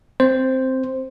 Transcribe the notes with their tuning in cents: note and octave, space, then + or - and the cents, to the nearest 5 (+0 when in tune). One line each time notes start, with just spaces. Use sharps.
C4 +0 C5 +0